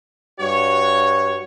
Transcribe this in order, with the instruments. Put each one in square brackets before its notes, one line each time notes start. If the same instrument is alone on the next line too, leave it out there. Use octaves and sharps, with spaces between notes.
[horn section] G2 F#4 C#5